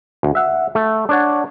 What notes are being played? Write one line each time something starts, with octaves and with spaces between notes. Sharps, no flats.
D2
E5 F#5
A3
D4 C#5 F#5